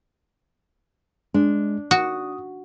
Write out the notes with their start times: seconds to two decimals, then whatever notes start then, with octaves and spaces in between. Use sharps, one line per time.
1.34 G#3 D4
1.91 F#4 D#6